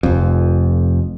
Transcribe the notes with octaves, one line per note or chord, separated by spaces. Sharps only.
F1 F2